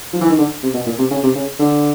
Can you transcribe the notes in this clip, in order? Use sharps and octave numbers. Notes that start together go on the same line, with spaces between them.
F3
E3
D#3
D3
C3
B2
A#2
C3
C#3
C3
C#3
D3